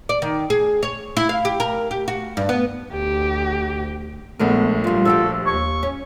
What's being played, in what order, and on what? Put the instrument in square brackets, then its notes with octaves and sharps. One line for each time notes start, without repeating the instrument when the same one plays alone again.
[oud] D5
D#3
G#4
C#5
E4
F5
G4
A#4
G4
F#4
G2
B3
[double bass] D2 [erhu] G4
[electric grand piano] A#1 A3 A#4 [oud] G#3 B4 [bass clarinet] B3
[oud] A#2 G3 [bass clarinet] F4
[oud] F3 F#4 G4 [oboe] A4
[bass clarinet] D#2 [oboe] C#6
[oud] C#4